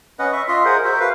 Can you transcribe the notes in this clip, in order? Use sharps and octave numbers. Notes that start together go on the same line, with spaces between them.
C#4 B4 D#5 F#5
E5 C#6
F4 D#5 E5 C6
G#4 A#4 C5 F#5
F#4 A#4 C5 E5
B4 F5